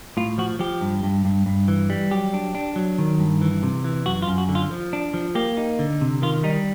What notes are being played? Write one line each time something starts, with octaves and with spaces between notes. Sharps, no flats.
A2 F4
F3 F#4
F3 G4
G2
G2
G2
G2
E3
G3
F#3 G4
D4
D4
F#3
D#3
G2
E3
C3
E3
F#2 F#4
F4
F#2
F#4
D3
F4
F3
D4
F3
A#3 G4
D#4
D3
C3
D#3 F4
G3 D#4